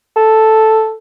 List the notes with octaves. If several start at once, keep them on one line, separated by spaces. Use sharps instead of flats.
A4